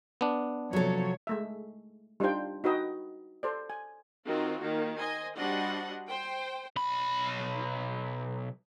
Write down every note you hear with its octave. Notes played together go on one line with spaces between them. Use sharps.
B3 D4
C3 F3 F#3 A4 C#5
G#3 A3 E5
G3 D4 D#4 F4 C5 G5
D#4 F#4 B4 D#5 G5
A4 C5 D5
G#5
D#3 C4 F4 F#4
D#3 A#3
C5 D#5 G#5
G3 D4 F#4 C5 D#5 F#5
C5 G5
B1 B5